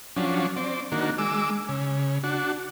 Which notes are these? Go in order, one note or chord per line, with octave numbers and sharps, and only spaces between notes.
F3 F#3 C#4 D4
C4 D5
D#3 A#3 D4 F#4
G#3 D6 E6
C#3
D4 F#4